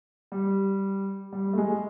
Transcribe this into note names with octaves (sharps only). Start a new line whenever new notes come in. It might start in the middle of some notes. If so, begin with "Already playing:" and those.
G3
G3
A3
G#3